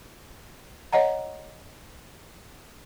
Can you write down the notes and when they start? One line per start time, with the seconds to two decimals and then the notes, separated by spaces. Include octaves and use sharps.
0.93 C#5 D#5 F#5 A#5